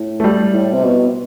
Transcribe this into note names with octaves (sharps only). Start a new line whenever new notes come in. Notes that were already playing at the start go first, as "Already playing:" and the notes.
Already playing: A2
A3
G3
A2
C3
B2